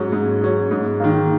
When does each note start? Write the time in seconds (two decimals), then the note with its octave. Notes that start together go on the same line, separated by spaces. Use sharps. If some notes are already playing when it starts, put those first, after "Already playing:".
Already playing: G#2 F#3 C#4
0.12 G#2
0.41 F#3 C#4
0.71 G#2
1.00 D#3 A#3